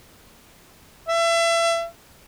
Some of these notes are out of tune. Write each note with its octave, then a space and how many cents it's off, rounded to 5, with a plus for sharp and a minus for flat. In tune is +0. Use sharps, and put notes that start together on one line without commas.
E5 +30